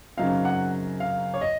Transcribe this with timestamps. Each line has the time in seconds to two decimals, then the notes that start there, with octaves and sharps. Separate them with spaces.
0.17 F#2 C#3 F#3 C4 D#4 F5
0.45 F#5
1.00 F5
1.34 C#5
1.41 D#5